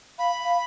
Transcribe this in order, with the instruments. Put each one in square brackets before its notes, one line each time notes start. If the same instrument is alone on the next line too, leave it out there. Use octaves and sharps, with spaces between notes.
[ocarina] F5 [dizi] B5
[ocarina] F5